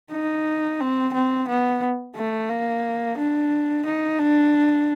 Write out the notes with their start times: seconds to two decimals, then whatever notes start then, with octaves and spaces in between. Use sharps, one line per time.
0.12 D#4
0.80 C4
1.13 C4
1.48 B3
2.16 A3
2.49 A#3
3.18 D4
3.85 D#4
4.19 D4